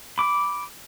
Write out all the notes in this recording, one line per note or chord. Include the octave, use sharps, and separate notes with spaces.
B5 D6